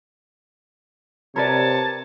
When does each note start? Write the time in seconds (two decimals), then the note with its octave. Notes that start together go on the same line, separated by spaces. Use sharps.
1.36 C3 A#4 B4 C#5 D5 A5